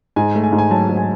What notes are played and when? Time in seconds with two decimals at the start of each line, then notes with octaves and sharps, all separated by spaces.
0.16 G#2 G#5
0.35 A3
0.44 G#5
0.52 G#2
0.58 G#5
0.71 F#3 A5
0.89 G#2
0.97 G#5